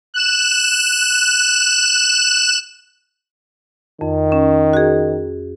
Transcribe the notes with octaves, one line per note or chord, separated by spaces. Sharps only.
F#6 E7
F2 D#3
C#4
F#4 G#4